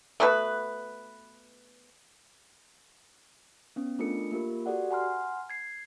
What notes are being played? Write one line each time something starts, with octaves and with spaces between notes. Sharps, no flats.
A3 B3 F#4 B4
B3 C#4
A3 D4 F4 A4 A#4 C#7
A#3 F4 G4 A#4
F#4 G4 A4 D5 F#5
F#5 G#5 A#5 C6 F6
G#6 C7